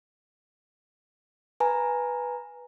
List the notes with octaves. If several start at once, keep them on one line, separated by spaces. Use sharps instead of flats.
B4 G#5 A#5